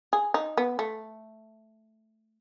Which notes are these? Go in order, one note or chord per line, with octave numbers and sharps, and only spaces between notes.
G#4
D#4
B3
A3